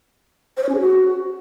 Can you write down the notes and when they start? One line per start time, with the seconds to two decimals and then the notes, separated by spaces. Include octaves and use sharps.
0.57 C5
0.63 C#5
0.69 C#4
0.75 G#4
0.80 F#4